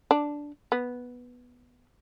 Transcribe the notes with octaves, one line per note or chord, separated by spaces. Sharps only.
D4
B3